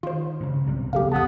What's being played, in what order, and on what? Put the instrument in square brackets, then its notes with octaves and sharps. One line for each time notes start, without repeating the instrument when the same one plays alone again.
[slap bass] D#3 [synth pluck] F4 C5
[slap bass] G2 C#3
B1 C3 G3
[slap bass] F#1 D2 B3 [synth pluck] G4 A4 F5
[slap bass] E1 F2 [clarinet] B3 [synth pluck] A5 D#6